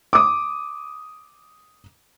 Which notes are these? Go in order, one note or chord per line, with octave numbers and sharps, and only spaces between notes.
D6 D#6